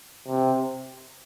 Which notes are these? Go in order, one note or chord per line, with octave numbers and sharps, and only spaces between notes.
C3